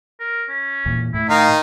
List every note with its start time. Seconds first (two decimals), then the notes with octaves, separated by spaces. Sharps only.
0.20 A#4
0.49 C#4
0.86 E2 A#2
1.14 A2 E4
1.30 D#3 D#4 F5